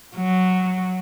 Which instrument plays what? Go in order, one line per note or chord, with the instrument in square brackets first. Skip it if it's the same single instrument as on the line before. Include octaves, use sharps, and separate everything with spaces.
[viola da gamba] F#3